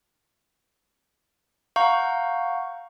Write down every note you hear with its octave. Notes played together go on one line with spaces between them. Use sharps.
F5 F#5 A#5 C#6 G6